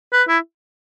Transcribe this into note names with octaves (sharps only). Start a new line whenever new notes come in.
B4
E4